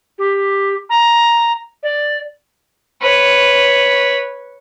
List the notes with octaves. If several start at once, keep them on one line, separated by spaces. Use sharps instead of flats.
G4
A#5
D5
B4 C#5